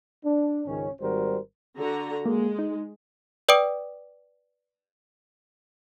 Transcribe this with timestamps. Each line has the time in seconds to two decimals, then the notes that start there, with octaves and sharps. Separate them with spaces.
0.24 D4
0.67 C#2 G#2 D#3 C#4
1.01 G#1 G3 F#4 A#4 C5
1.76 D3 F#4 A#5
2.26 G#3 A#3
2.59 D#4
3.49 B4 D5 G5 D6 D#6 D7